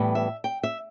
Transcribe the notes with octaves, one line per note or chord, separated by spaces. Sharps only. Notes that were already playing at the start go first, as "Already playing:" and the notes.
Already playing: A2 E3 G3 B3
E5
G5
E5